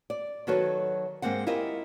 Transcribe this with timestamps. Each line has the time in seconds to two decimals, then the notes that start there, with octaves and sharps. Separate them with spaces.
0.10 D5
0.47 D#3 F#3 F#4 A4 B4 C#5
1.22 G#2 D#3 G#3 A#3 C4 F#5
1.46 E4 F4 G4 A#4 D#5